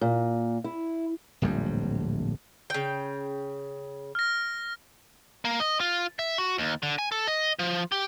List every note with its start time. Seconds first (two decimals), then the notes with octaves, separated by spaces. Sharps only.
0.01 A#2
0.64 E4
1.42 D1 A#1 F2 G3
2.70 C#3 G5
4.15 F6 A#6
5.45 A#3
5.60 D#5
5.80 F4
6.19 E5
6.38 F#4
6.58 D#2
6.83 D3
6.99 G#5
7.12 A4
7.28 D#5
7.59 F3
7.92 G4